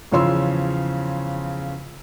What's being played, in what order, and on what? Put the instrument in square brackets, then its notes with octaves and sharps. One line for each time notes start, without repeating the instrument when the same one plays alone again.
[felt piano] E2 C#3 F3 C#5 C6 E6